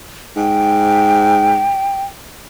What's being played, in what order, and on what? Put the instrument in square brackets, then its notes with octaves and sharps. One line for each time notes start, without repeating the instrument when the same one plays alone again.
[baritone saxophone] G#2 [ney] G5